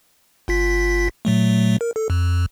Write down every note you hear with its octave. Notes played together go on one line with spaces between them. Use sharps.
G1 F4 B6
A#2 F#3 A3
A#4
A4
F2